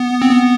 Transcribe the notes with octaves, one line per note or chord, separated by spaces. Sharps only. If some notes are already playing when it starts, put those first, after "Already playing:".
Already playing: B3
C4
B3